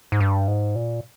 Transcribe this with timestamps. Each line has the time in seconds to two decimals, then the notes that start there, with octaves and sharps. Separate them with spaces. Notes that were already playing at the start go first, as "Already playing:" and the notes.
0.12 G#2
0.20 G2
0.48 G#2
0.76 A#2